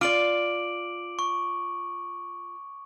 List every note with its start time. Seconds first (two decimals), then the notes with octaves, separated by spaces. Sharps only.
0.01 F4 D5 D6 D7 F#7
1.19 C#6